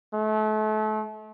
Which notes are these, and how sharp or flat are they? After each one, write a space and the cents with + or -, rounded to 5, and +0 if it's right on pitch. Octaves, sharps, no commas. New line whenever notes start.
A3 -35